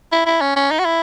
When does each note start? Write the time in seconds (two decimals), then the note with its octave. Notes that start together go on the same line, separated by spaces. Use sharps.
0.12 E4
0.26 E4
0.41 C#4
0.56 C#4
0.71 D#4
0.79 F#4
0.85 E4